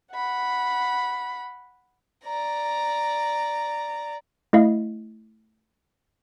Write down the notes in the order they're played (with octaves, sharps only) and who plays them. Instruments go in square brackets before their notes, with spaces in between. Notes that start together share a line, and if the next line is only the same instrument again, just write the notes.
[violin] F#5 B5
[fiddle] D5 A#5
[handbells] A3 E4 D#5 F5